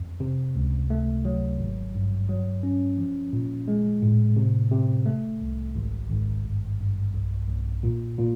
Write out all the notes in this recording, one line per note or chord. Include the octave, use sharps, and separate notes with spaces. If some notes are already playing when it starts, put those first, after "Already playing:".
Already playing: F2
C3
C#2
A3
F#3
G#1
G2
F#3
C#4
F3
A#2
G#3
A2
C3
C3
A3
C2
G#1
G#1
G2
G2
B1
B1
A#2
A#2